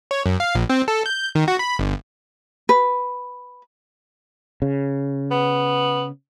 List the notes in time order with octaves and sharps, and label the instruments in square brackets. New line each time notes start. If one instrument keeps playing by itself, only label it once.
[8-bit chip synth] C#5
F#2
F5
A#1
C4
A4
G6
D#3
F#4
B5
G1
[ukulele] B4
[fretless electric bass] C#3
[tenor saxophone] B3